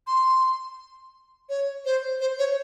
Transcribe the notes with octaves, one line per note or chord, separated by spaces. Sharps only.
C6
C#5
C5
C5
C#5